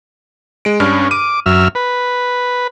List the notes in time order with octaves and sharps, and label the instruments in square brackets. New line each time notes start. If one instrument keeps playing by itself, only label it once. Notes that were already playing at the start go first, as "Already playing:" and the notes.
[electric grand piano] G#3 D7
[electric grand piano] G2 D4 F6 [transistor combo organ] C#4
[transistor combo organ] D6 [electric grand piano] D#7
[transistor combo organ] F#2 E5 F6
B4